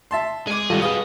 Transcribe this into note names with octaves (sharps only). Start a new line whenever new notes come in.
E5 A5 C6
G#3 G#4 G#5 D6
G#1 G3 F4 F#4 A4 D#5
G#4 B4 F5 D#6